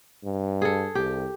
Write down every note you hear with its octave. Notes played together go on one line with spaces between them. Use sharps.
G2
G#4 A4
C2 G4